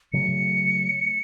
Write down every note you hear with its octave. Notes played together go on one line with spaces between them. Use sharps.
C#3 F#3 A3 C#7